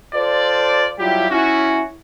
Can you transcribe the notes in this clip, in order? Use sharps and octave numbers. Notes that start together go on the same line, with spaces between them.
F4 A4 C5 D5
F#3 G3 E4 F4 G4
C#4 E4 F#4